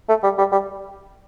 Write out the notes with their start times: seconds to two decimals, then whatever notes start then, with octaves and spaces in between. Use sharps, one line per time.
0.09 A3
0.23 G3
0.38 G3
0.52 G3